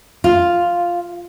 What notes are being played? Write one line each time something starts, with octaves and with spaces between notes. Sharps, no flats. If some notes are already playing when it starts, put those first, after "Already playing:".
F4